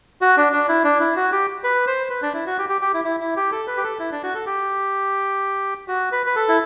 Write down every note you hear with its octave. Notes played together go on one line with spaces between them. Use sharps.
F#4
D4
D4
E4
D4
E4
F#4
G4
B4
C5
B4
D4
E4
F#4
G4
G4
G4
E4
E4
E4
G4
A4
B4
G4
A4
E4
D4
F#4
A4
G4
F#4
B4
B4
A4
E4